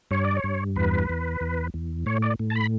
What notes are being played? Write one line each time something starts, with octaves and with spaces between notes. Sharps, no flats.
G2 C#5
D5
C#5
G2
E2 B4
E2
E2
E2
A2 C#5
D5
A2
A5
B5